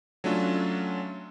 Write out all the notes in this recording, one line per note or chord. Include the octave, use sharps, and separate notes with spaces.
F#3 A3 C#4 D4 F4